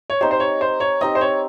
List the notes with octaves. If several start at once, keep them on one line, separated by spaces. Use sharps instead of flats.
C#5
C4 D#4 G4 C5
C5
C#5
C5
C#5
C4 D#4 G4 D#5
C5
C#5